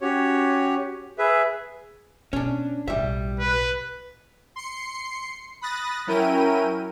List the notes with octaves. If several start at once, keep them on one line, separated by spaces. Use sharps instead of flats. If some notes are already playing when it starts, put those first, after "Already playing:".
C#4 F#4 G4 C#5
G#4 B4 E5
B2 C#4 D4
B1 A2 G3 E5
B4
C6 C7 C#7
B5 D#6 F#6 A6 A#6
F#3 C#4 E4 A#4 G5 D#7